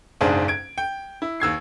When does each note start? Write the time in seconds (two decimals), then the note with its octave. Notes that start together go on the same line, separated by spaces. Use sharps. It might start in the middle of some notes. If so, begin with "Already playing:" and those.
0.21 F#1 B1 G#2 D4 G#4 C5
0.48 G#6 D7
0.78 G5
1.22 E4
1.40 D#2 E6 G#6 C7